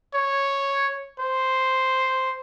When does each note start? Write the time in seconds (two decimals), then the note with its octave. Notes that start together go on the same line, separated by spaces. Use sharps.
0.14 C#5
1.20 C5